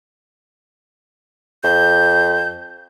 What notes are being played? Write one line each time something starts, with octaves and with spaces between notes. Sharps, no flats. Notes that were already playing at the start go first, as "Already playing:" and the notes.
F2 G6